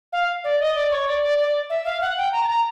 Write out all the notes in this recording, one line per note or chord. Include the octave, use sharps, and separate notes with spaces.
F5
D5
D#5
D5
C#5
D5
D5
D5
E5
F5
F#5
G5
A#5
A5
A#5